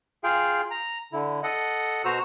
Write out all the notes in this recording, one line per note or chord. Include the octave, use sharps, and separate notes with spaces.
F4 G#4 F5 G5
A#5
D3 E4
A4 D#5 F#5
B2 F#4 C5 A#5 E6